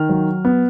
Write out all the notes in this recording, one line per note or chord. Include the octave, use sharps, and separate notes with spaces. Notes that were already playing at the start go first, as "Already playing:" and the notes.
Already playing: D#3 F6
F#3
B3